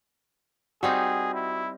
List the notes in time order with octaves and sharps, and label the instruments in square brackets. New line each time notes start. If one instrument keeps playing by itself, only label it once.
[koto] G3 C4 D#4 [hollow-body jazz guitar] F#4 [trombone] G#4
[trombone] E4